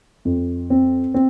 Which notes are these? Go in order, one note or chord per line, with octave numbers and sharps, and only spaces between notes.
F2
C4
C4